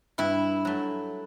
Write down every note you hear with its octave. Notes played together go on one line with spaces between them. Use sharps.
G2 E4
F#3 A3